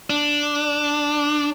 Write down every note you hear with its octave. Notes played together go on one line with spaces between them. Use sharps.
D4